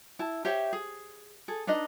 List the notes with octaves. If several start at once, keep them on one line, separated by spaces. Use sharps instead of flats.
E4 A5
G4 C5 C#5 E5
G#4
G#4 A4
D4 D#4 B4 D#5